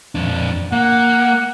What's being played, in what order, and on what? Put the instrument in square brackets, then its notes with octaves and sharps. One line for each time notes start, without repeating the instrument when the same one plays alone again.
[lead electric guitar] F2 D4
[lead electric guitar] A#3 [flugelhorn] F#5